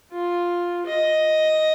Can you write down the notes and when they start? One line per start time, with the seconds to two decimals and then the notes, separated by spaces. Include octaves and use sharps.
0.13 F4
0.86 D#5